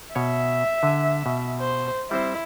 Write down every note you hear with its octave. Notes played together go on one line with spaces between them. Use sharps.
B2 C#5 E5
D3 G#5
B2
C5
G3 C4 E4 C5